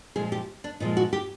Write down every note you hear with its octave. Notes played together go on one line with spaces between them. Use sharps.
A#2 F3 G#3 G#4
G4
D4
A#2 F3 G#3 D#4
F#4
G4